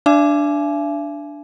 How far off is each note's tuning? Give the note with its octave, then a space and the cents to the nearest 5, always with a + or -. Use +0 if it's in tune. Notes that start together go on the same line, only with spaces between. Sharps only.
D4 +0 E5 +45 G#5 +35